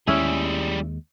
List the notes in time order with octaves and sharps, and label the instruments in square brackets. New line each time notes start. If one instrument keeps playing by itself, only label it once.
[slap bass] D#2 G#3 [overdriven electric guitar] G3 G#4 [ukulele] C#4 E4